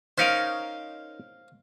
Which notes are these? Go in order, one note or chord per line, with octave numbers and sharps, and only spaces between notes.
C#4 D#4 A#4 C5 F5